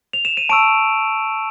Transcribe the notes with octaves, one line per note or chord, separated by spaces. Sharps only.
F7
E7
D#7
A5 C#6 E6 D7